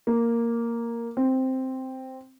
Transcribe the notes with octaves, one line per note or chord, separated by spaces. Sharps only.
A#3
C4